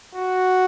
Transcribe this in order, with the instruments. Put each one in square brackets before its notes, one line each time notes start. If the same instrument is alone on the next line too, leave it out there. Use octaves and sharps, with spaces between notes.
[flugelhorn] F#4